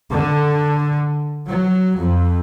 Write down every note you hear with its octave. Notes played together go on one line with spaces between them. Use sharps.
D3
F#3
F2